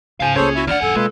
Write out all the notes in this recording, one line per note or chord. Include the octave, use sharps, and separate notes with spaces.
G#2 C#3 C5 F5 G#5
C#2 A#3 C#4 G#4 A4 C5 C#5
E4 F#4 E5
D#2 D4 D#4 D5 F#5 F6
A#1 F#2 A4 G#5
B2 G#3 A#3 F4 B4